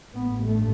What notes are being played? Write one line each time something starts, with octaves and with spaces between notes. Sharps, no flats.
A1 G2 B3
A3